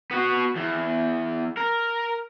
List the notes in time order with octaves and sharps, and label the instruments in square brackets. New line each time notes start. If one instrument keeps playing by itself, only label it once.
[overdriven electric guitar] B3 F#4
E2
A#4